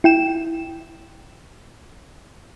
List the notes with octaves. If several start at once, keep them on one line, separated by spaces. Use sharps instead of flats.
E4 G5 E7